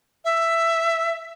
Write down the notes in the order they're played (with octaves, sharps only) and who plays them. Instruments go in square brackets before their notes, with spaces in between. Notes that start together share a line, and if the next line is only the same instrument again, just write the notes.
[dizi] E5